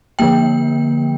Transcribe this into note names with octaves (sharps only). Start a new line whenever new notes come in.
D3 F3 A#3 G5